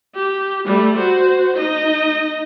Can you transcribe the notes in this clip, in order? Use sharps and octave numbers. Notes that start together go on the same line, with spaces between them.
G4
G3 A3
F#4 C5
D#4 D#5